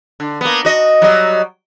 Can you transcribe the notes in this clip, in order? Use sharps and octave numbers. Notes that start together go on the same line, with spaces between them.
D3
A#3 B3
F#4 D#5
F#3 G3 D#5